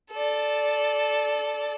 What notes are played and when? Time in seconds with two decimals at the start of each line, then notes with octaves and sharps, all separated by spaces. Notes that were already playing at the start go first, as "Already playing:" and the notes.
0.11 A4 D5